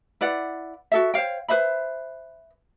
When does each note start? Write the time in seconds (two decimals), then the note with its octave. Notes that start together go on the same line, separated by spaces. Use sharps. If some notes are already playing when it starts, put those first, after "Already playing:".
0.21 E4 B4 D5 F#5
0.92 F#4 A4 E5
1.14 C5 C#5 F5 G5
1.48 B4 C5 E5 B5